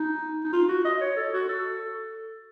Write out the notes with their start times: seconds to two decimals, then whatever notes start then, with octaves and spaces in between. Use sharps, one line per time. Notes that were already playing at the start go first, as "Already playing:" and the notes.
Already playing: D#4
0.44 D#4
0.53 F4
0.69 F#4
0.85 D#5
1.01 C#5
1.16 A4
1.33 F#4
1.48 A4